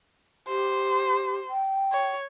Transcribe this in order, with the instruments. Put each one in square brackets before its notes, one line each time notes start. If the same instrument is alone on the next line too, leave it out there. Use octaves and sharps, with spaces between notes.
[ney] G4 [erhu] C5
[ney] G5
[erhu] C#5